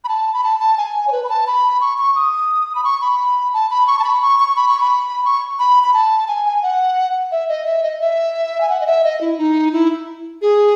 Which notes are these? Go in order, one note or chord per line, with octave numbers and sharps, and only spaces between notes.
B5
A5
B5
A5
A5
G#5
C#5
B4
B5
A5
B5
C#6
C#6
D#6
B5
C#6
B5
A5
B5
C#6
A5
B5
C#6
C#6
B5
C#6
B5
C#6
B5
B5
A5
G#5
G#5
F#5
E5
D#5
E5
D#5
E5
G#5
F#5
D#5
E5
D#5
E4
D#4
E4
G#4